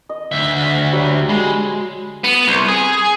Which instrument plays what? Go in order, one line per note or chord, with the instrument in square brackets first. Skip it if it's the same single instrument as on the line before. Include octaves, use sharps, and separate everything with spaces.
[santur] D#5
[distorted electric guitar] D2 E5
[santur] F#3 G3
[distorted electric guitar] G#3 [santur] B5
[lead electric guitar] B3
C2
G#4